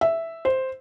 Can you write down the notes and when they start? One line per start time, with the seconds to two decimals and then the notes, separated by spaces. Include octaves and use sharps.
0.01 E5
0.45 C5